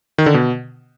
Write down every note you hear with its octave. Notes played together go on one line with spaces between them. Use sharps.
D#3
D3
B2